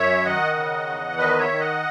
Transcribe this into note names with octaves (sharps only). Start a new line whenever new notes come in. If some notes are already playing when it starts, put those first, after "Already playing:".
Already playing: F#2 C#5 E5
D#3 D#5 F#5
C#3
E2
D#3 B4 D#5
C#5 E5
D#3
D#5 F#5